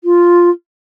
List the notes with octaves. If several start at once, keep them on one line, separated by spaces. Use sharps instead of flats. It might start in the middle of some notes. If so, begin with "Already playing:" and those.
F4